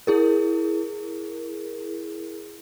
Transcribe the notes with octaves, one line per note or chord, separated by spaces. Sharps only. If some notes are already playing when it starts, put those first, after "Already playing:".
E4 G#4 A#4